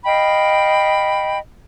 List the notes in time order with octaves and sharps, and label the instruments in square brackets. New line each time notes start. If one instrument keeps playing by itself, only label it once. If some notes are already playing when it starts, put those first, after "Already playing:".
[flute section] D#5 F5 G5 B5